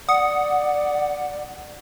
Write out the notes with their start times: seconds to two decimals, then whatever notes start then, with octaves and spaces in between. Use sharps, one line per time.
0.09 D5 F#5 D#6